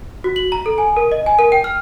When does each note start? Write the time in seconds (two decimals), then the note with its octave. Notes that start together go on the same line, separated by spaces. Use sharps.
0.24 F#4
0.36 F#7
0.52 A#5
0.66 A4
0.78 G#5
0.97 A#4
1.12 D#5
1.26 G#5
1.39 A#4
1.52 G5
1.64 F6